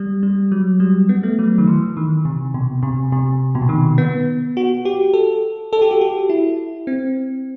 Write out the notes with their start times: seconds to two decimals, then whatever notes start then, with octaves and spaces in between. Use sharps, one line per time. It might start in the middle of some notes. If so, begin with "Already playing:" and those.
Already playing: G3
0.23 G3
0.52 F#3
0.80 G3
1.09 B3
1.23 A3
1.39 F#3
1.58 D#3
1.67 E3
1.97 D#3
2.25 C3
2.54 B2
2.83 C3
3.12 C3
3.55 B2
3.62 C3
3.69 D#3
3.98 B3
4.57 F#4
4.85 G4
5.14 A4
5.73 A4
5.82 G4
5.91 F#4
6.01 G4
6.30 E4
6.87 C4